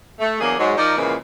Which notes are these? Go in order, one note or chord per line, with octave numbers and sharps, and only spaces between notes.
A3
E2 F#3 A#3 D4 G#4
G#2 F#3 G#3
F3 D#4 A#4 D5
A#2 C#3 E3 F3 G#3 A#3